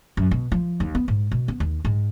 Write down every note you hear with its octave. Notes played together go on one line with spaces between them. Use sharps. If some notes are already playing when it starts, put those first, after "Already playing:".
F#2
B2
F3
D#2
B3
G#2
B2
B3
D#2
G#2